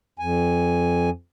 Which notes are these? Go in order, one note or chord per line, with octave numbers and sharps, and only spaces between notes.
F2 G#5